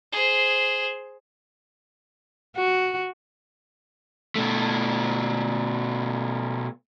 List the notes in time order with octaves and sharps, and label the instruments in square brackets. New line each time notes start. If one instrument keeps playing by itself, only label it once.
[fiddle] G#4 C5
[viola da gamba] F#4
[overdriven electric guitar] B2 A3